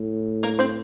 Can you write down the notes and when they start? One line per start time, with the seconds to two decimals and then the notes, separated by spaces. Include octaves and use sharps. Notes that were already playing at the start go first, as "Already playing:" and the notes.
Already playing: A2
0.43 A#3 A#4
0.59 C4 C5